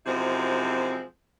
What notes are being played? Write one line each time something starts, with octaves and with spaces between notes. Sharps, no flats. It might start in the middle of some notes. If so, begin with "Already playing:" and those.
F#2 C3 F3 G#3 C4 E4